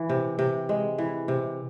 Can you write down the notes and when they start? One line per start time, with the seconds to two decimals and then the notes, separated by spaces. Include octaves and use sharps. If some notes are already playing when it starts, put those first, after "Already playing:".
Already playing: E3
0.09 C3
0.39 C3
0.69 G#3
0.98 E3
1.28 C3